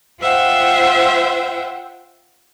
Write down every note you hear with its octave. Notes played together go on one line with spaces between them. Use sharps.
F4 C5 E5 F#5 G5